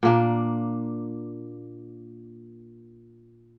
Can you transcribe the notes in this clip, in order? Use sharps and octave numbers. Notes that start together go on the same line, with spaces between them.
A#2 A#3 D4